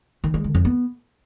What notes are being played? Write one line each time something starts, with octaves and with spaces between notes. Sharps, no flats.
D#3
G#3
D3
F2
B3